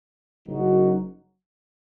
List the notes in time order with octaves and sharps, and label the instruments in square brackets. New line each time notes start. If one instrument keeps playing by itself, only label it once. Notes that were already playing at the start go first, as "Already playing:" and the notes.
[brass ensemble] F#1 F#2 F#3 D#4 F#4